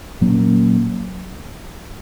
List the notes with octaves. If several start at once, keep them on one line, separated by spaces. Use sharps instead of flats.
A#2 F#3 A#3 C#4